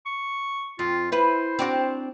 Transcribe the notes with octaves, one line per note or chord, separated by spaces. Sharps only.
C#6
F2 F4
E4 B4 C5
C4 D4 F#4